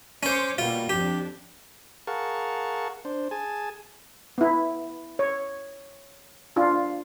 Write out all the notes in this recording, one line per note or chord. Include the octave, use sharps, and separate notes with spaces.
C#4 C5 C#5 C6 D6
B2 G3 A#3 F4
F2 D4 G4
G#4 A#4 F5 F#5 A5 C#6
D4 C5
G#4 G#5 A5
B3 E4
C#5
D4 F4